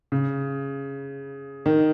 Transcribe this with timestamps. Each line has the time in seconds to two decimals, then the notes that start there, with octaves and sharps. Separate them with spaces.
0.12 C#3
1.66 D#3